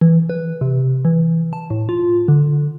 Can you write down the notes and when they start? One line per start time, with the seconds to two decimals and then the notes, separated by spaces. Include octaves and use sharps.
0.01 E3
0.30 B4
0.61 C3
1.05 E3
1.53 A5
1.70 A2
1.89 F4
2.28 D3